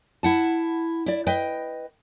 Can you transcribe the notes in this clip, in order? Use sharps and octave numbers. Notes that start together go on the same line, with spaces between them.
E4 F#5 A5
E4 D5
B4 D#5 G5